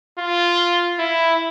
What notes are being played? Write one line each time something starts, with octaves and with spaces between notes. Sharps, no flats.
F4
E4